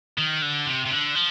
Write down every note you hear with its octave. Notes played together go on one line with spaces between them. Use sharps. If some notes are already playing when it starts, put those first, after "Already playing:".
D#3
D3
C3
C3
D3
F3